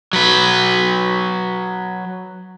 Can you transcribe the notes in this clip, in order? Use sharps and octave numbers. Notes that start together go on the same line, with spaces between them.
F#3 B4